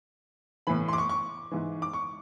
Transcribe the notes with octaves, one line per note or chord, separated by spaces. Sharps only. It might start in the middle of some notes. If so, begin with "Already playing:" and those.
A2 E3 B5
C6
D6
C#6
C#6
G#2 E3
D6
C#6